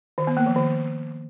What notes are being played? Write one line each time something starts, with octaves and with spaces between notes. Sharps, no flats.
D#3
B3
A#3
F3
D#3